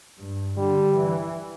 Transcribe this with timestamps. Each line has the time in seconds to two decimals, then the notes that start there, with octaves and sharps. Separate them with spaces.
0.19 G2
0.58 D3 G3
0.95 E3